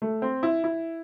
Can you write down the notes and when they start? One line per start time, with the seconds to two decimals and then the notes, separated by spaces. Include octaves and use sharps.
0.02 A3
0.22 C4
0.43 E4
0.64 E4